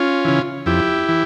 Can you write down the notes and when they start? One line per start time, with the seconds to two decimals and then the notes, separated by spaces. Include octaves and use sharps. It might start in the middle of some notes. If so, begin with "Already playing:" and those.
Already playing: C#4 F4
0.25 C#3 E3
0.66 F2 E4 G4
1.09 E3